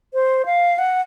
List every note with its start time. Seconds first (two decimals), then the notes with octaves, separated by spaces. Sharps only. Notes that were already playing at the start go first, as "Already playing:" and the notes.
0.14 C5
0.46 F5
0.78 F#5